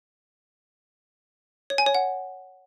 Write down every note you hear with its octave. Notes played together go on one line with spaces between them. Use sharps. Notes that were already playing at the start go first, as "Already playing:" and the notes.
C#5
G#5
C#5
F#5